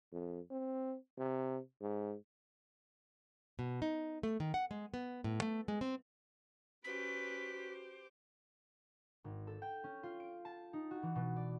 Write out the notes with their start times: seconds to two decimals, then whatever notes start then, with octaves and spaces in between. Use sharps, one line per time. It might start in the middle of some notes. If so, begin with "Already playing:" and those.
0.12 F2
0.51 C4
1.18 C3
1.81 G#2
3.59 B2
3.82 D#4
4.23 A3
4.40 D#3
4.54 F#5
4.71 G#3
4.94 B3
5.24 A2
5.42 A3
5.68 G#3
5.81 C4
6.84 C#4 F#4 G4 B4 C5 D6 B6
9.24 G#1
9.47 A4
9.62 G5
9.84 C#4
10.03 F4
10.20 D7
10.45 A5
10.73 D#4
10.91 F#4
11.03 E3
11.15 B2
11.36 D5